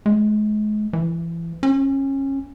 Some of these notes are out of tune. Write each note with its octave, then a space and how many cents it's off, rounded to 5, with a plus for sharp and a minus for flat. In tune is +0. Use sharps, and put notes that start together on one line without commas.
G#3 +35
E3 +25
C#4 -25